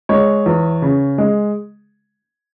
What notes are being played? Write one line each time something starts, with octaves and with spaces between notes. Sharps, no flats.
G#3 C#5
E2
C#3
G#3